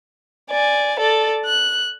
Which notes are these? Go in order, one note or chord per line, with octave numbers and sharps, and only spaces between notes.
D5 G#5
A4 D5
F#6